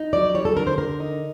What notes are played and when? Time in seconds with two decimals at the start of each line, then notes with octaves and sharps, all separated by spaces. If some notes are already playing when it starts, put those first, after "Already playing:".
Already playing: D#4
0.13 F#3 D5
0.34 G3 C#5
0.45 A4
0.56 D3 A#4
0.67 C5
0.78 D3 A#4
1.00 D#4